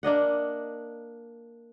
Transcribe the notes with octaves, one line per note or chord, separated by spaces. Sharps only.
A#3 D4 D#5 F#5